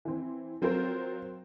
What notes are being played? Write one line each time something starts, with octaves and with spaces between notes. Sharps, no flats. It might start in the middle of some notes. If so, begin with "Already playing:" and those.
E3 C4
F#3 C4 F4 A#4 C5